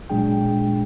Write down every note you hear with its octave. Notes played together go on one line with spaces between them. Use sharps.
A#2 F#3 G#3 D4 G#4 G5